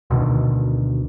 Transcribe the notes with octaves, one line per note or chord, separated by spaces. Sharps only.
D2 B2 D3 D#3